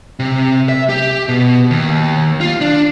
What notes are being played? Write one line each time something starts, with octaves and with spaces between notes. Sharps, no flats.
C3
E5
G4
B2
D#2
F4
D4